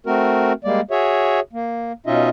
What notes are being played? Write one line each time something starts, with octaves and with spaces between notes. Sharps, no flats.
A3 C4 F#4 A#4
G3 G#3 A#3 D5
F#4 G#4 C#5 E5
A#3
B2 C#4 D#4 F4 D#5 E5